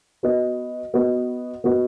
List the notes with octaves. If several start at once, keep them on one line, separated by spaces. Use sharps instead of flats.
B3 F#4 B4 D#5
B3 F#4 B4 D#5
B3 F#4 B4 D#5